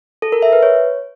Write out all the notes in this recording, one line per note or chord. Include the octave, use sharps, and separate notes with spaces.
A4
A#4
E5
B4
C#5